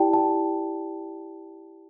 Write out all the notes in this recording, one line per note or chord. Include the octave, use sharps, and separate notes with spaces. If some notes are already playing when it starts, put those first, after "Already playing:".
Already playing: E4 G4 D5 G5 A5
A5